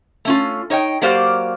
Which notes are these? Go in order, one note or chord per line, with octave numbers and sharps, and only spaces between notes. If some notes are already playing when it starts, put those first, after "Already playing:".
A3 C#4 F4
D#4 C#5 D#5 G5
F#3 A#3 G4 C5 D5 F5